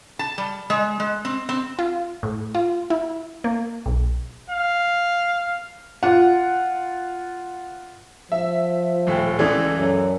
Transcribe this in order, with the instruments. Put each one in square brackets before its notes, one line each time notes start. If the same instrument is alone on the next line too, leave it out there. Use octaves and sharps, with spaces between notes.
[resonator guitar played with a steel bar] A5
G3
G#3
G#3
C4
C4
[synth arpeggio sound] F4
A2
F4
E4
A#3
B1
[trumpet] F5
[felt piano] F4 F#5
[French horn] F3 [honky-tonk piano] E5
[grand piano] D#1 A2 G5
[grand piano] C#2 C#3 E3 [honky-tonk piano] E4 A4 D5
[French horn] F#2